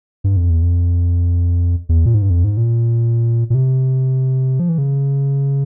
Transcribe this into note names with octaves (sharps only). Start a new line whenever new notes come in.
G2
F2
E2
F2
E2
A#2
G#2
G2
F2
G#2
A#2
A#2
C3
F3
E3
C#3